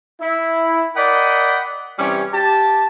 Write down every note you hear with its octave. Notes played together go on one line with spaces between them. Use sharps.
E4
A#4 D5 D#5 F#5 G5 B5
C3 E3 G3 C#4
G4 A5